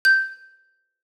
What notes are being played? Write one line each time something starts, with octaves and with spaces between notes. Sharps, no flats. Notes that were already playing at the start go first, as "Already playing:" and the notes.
G6